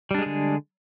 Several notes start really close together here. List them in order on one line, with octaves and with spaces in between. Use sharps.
G3 D4 G#3 G#4 D3